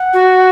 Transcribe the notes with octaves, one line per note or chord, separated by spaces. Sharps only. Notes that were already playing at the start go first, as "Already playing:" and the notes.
Already playing: F#5
F#4